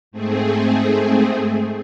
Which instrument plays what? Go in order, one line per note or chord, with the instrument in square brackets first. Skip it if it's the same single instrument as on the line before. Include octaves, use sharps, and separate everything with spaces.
[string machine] G#2 A3 C4 G#4